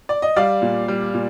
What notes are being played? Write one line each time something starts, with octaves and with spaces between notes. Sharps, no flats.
D5
D#5
G3 D5 F5
A#2
G3
A#2